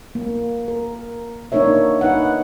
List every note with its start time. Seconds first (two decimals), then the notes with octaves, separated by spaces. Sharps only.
0.15 A#3
0.68 A#4
1.52 A#3 D4 D#4 A#4 C#5 E5
2.01 D#4 B4 F#5